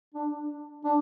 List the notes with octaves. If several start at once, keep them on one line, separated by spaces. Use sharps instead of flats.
D4
D4